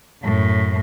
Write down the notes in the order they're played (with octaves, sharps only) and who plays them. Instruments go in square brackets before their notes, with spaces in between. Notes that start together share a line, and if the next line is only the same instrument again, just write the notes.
[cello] F#2 A2